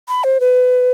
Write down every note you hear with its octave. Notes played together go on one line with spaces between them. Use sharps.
B5
C5
B4